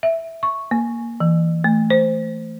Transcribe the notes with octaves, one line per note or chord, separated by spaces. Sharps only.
E5
C#6
A#3
E3
A3
C5